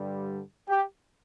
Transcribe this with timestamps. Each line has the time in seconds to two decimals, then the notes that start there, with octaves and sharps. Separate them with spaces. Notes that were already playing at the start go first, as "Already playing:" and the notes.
Already playing: G2 D3 G3
0.68 G4